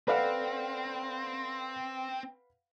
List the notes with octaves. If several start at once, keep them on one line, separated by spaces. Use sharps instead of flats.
C4 A4 B4 D5 F5 F#5